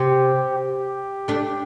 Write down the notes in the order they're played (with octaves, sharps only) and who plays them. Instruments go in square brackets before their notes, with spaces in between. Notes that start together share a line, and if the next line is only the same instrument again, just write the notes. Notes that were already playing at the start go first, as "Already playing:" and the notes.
Already playing: [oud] C3 [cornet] G4
[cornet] G4
[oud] A3 D4